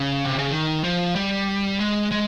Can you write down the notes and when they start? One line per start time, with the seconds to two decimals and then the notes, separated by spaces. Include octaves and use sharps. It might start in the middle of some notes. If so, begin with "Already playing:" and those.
Already playing: C#3
0.25 C3
0.38 C#3
0.51 D#3
0.84 F3
1.15 G3
1.80 G#3
2.12 G#3